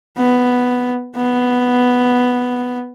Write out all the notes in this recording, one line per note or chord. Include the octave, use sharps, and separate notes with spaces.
B3
B3